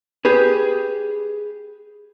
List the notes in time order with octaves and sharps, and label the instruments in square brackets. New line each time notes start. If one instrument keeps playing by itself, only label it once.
[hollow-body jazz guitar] G4 G#4 B4